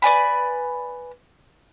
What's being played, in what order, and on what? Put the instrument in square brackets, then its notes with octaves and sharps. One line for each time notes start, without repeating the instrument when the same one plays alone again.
[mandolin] B4 D5 G#5 B5